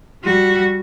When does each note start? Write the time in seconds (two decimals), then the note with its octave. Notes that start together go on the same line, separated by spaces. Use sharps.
0.24 G3 F#4